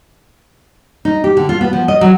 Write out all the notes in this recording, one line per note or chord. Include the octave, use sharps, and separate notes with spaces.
D#4
G4
D3
F4
B3
F3
D#5
F#3